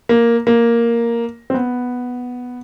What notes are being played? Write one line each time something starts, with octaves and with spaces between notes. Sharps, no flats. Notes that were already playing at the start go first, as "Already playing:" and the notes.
A#3
A#3
C4
B3